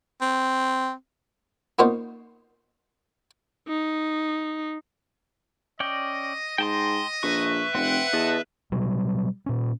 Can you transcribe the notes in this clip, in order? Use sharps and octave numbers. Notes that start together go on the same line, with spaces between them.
C4
A#3 B3 C#4 D#4 F4 C5
D#4
C#4 D5 D#5 G5
G#2 D#5 G5 A5 C6
A#1 B4 E5 C#6
F1 C4 F#5 G5
E2 A4 D#5 A5
B2 F#3 G3
A#2 C#4